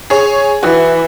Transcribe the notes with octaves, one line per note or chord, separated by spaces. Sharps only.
G#4 C#5
E3 F#4